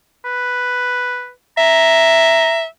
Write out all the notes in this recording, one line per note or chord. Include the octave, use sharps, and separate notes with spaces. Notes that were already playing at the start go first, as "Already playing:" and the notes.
B4
E5 A#5